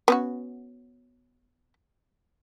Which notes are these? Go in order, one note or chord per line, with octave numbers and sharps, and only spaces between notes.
B3 C#4 F#4